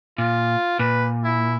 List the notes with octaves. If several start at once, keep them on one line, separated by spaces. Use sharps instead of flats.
A#2 F4
A#2 B4
E4